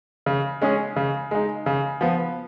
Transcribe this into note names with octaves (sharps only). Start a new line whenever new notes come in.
C#3
G#3 C#4 G#4
C#3
G#3 D#4
C#3
F3 B3